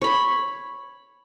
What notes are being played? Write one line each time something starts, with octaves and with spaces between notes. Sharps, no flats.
C#5 B5